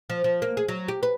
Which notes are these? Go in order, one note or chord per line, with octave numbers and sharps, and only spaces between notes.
F3
F3
A#3
G#4
F#3
G4
B4